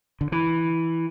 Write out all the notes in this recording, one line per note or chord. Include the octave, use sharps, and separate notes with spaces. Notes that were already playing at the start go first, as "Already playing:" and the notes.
D3
E3